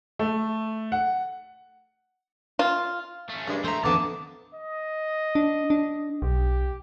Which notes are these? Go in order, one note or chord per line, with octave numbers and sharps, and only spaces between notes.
A3
F#5
F4
A3 C#4
G2 D3 G#3 A#3
E3 A3 C5 E5 A#5
F2 D3 D#3 B3 C4 D5 A5
D#5
D4
D4
B1 G4